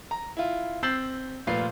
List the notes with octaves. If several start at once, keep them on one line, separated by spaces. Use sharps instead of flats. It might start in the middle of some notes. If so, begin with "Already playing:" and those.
A#5
E4 F4
C4 E6 G6 A6 C7 F#7
F1 A#2 F4 B4 C7